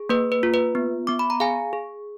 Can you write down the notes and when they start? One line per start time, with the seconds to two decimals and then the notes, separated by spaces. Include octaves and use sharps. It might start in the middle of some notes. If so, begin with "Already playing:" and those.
Already playing: G#4
0.09 A#3 B4
0.32 B4
0.43 F4
0.54 B4
0.75 B3
1.07 B3 D6
1.19 B5
1.30 A#5
1.40 G#4 F5 G#5
1.73 G#4